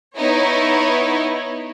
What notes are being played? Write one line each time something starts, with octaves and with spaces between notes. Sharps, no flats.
B3 D#4 E4 C#5